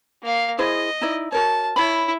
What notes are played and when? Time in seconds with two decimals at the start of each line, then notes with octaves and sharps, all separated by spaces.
0.23 A#3 F5
0.59 E4 G#4 C5 D#5
1.01 D#4 E4 D5
1.32 F#4 A#4 C#5 A5
1.76 E4 C#5 B5